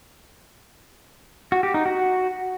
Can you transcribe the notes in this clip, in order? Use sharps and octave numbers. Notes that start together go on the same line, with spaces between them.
F#4
G4
D#4
F#4